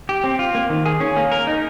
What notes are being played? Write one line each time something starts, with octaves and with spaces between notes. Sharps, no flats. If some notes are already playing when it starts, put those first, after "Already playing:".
G4
C4
F4
A#3
D#3
G#4
C#4
A#3
A#4
D#4